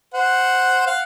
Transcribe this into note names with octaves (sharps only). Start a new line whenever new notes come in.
C5 F#5
F5 F#5